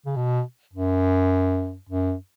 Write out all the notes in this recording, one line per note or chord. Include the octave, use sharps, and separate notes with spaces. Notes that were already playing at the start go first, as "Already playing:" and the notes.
C#3
B2
F#2
F#2